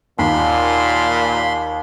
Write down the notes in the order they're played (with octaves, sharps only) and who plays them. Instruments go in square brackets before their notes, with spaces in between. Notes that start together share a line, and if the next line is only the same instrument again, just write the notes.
[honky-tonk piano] D#2 [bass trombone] A#2 [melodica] B5 C6